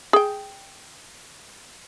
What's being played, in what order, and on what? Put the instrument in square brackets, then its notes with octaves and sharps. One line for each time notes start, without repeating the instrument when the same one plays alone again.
[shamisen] G#4 G5